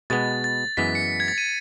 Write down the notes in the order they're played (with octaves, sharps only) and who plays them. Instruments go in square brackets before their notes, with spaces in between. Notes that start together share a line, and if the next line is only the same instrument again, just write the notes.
[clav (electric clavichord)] B2 G#3 B3 [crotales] A6
[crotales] A6
[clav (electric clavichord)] F#2 E3 G#3 B3 [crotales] B6
[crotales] C#7
G#6
A6
D#7